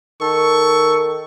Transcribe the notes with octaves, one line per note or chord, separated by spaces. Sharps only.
D#3 A4 C#6